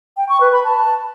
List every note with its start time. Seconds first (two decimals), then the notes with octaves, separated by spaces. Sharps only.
0.17 G5
0.29 C#6
0.41 B4
0.52 B5
0.64 A5